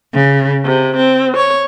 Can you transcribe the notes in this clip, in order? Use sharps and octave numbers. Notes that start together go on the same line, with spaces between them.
C#3
C3
C4
C#5